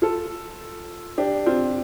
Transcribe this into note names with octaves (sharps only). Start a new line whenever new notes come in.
F4 A4
D4 G4
C4 F4